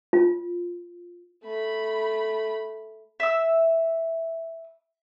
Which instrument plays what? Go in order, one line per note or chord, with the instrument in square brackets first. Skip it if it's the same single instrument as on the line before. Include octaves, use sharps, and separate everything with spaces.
[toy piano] F4
[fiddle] A3 B5
[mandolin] E5 E6